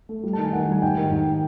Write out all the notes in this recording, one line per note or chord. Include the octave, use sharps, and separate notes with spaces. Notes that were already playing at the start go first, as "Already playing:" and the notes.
A3
G3
A5
D#3
G#5
D#3 F#5
G3 G#5
G#2 G5
D#3
G#2